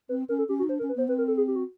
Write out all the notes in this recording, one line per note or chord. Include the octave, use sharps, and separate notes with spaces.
C4 B4
C#4 A#4
A4
C#4 G4
F#4
D#4
D4 C5
A#4
C#4
B4
B3 C5
C4 B4
A#4
A4
G#4
G4
F#4